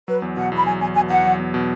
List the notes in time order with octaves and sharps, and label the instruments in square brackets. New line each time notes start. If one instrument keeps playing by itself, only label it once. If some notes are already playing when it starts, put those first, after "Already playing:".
[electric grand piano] F#3 [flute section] B4
[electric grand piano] E2
[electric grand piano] B2 [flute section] F#5
[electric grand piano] E2 [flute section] B5
[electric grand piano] F#3 [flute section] G#5
[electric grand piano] E2 [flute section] G#5
[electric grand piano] B2 [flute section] G#5
[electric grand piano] E2 [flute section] F#5
[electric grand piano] F#3
E2
B2